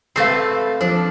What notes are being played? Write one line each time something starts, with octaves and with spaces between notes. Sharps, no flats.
G3 A3 C4 B4 F5 A6 C7
F3 D4